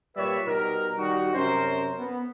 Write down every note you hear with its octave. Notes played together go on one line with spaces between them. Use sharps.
A#2 G3 B4 C#5 D5 E5
B2 G3 D#4 A#4
D#3 G3 D#4 F#4
F#2 C3 C#4 A#4 C5
B3